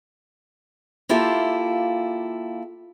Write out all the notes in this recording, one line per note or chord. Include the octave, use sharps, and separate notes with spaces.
A#3 E4 F4 G4 A4